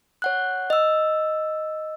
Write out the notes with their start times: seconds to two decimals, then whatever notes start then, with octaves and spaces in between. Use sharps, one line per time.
0.22 C#5 F#5 F#6
0.70 D#5 E6